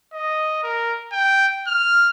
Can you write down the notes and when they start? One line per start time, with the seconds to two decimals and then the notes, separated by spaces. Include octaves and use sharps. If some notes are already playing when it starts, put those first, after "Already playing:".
0.13 D#5
0.63 A#4
1.12 G5
1.67 F6